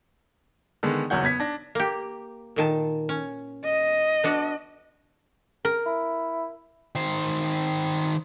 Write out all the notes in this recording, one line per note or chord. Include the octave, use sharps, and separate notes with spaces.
D3 D#3 G#3 B3
F#1 E2 F#3 C#5 F#5 G6
B3 G#6 B6
D4 A#6
A#3 G4
A#2 D#3 A5
C#4
D#5
B3 D4 F#4
A#4
E4
D#3 C5